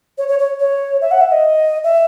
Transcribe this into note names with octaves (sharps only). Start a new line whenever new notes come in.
C#5
C#5
C#5
C#5
E5
F#5
E5
D#5
E5